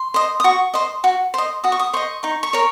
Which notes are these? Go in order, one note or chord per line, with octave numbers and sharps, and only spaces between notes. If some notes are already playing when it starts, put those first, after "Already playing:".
Already playing: C6
C5 D#5
D#6
F#4 C#6
C5 D#5
F#4
C5 D#5
F#4 D#6
C#6
D#6
C5 D#5 C#6
D#4 C#6
C#6
A#4 C#5